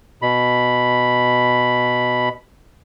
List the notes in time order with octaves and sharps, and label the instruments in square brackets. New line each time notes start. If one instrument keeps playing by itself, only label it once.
[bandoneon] B2 B5